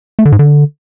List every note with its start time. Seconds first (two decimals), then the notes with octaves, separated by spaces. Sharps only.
0.19 A3
0.25 D3
0.32 G#2
0.39 D3